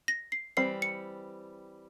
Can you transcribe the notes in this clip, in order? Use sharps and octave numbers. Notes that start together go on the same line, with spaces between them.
A#6
C7
E3 G3 C4 C7
C#7